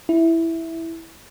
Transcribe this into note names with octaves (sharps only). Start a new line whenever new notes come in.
E4